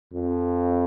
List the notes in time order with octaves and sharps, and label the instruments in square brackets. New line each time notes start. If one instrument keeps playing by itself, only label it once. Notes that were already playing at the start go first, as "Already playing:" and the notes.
[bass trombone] F2